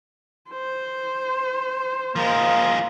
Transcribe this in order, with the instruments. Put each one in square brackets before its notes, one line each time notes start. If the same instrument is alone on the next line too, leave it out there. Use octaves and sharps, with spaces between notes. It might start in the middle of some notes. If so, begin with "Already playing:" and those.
[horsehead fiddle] C5
[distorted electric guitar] F3 G#3 [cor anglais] A#3